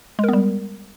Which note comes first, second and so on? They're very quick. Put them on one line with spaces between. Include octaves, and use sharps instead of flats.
G#3 A#4 B3 G3